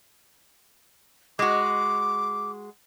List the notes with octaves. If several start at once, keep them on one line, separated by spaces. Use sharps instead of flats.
G#3 F#4 D6